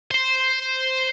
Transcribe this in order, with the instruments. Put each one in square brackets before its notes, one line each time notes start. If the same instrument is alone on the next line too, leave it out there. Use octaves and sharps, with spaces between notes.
[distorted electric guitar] C5 C6